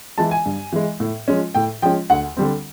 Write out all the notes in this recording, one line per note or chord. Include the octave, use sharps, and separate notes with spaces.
E3 G#3 A5
G#5
G2
E3 G#3
A2
F3 G#3 C#4
A2 G5
F3 G#3 C#4 G5
D2 F#5
D3 G3 C4